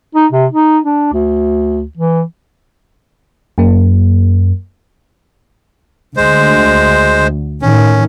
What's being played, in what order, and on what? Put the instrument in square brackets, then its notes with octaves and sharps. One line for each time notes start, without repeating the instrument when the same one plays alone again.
[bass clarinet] D#4
C3
D#4
D4
D2
E3
[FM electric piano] F#2 A#3
[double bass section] D2 [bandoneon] G#3 C5
[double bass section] A2 D#3 [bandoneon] C#4